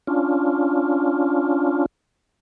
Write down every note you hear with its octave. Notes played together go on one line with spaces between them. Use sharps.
C#4 D4 F4